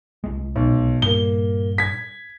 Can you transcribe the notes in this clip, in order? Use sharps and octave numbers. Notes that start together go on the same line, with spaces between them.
C2 G#3
B1
G2 A#2 A#3 G7
G#6 B6